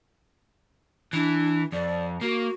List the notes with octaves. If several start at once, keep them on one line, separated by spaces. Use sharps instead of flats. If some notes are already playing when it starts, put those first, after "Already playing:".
E3 D4
F2 D5
A#3 F#4